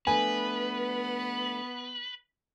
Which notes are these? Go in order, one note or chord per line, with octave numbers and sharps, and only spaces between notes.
F3 A3 B3 D4 B4 G#5